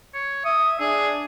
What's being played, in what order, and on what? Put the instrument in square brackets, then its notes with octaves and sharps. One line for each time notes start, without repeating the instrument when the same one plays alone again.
[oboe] C#5
[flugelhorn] E5 [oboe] D#6
[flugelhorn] D4 [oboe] G#4